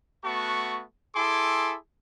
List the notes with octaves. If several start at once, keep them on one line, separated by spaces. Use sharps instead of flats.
A3 B3 F#4 A5 C#6
E4 G#4 A4 G#5 C6 D6